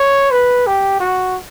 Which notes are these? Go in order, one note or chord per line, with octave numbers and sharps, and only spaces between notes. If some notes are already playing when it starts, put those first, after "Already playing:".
Already playing: C#5
B4
G4
F#4